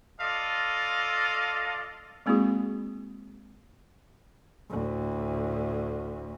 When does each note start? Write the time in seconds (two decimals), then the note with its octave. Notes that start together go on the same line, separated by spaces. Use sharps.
0.21 F4 A4 D5 D#5 F5
2.26 G#3 A#3 C4 E4 F#4 G#4
4.70 D2 A2